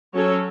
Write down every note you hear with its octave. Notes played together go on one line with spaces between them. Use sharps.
F#3 C#4 A4 C#5